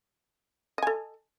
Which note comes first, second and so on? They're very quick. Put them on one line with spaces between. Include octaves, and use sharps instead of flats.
D#5 G#5 A4